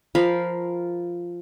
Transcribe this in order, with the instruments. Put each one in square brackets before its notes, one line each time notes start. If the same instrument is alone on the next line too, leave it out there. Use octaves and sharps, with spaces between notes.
[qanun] F3 A#4 F5 B5